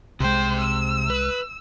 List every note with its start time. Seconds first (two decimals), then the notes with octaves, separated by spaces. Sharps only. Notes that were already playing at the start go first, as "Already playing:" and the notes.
0.20 C2 C3 G#3 C5 G5
0.60 E6
1.10 B4